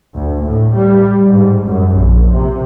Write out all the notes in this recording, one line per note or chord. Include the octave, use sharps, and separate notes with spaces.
D2
A2
G3
G#2
F#2
A#1
C3